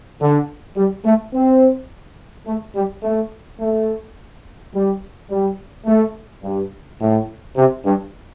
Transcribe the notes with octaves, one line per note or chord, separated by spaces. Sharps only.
D3
G3
A3
C4
A3
G3
A3
A3
G3
G3
A3
G2
A2
C3
G2